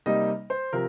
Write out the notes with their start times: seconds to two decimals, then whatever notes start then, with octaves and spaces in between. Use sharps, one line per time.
0.06 C3 G3 A#3 D#4 D#5
0.50 C5
0.73 C3 F3 A#4